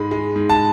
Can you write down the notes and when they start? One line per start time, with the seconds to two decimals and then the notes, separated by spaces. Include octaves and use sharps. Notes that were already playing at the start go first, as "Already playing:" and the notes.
Already playing: G#2 G#3 B5
0.11 G#3
0.36 G#2
0.49 A5